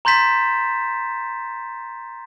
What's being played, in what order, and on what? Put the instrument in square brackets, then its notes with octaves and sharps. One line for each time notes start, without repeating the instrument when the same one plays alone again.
[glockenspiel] A#5 C6 G6 A6 B6 E7